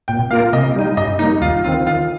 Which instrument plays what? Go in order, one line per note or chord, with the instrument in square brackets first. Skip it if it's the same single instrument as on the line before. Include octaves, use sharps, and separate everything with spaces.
[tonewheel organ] A#2 [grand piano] G5
[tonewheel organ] A#3 F4 A#4 [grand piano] F5
[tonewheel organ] C3 [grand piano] D#5
[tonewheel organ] G3 D#4
[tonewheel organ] G2 [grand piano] D#5
[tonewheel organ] G3 A#3 [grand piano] D#4
[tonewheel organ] D#2 [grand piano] F4
[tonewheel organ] D#3 C4 [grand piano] F4
[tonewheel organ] D#3 [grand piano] F4